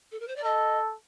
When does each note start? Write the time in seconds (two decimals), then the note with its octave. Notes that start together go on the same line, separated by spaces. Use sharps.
0.11 A4
0.19 A#4
0.27 C5
0.36 D5
0.43 A4 D#5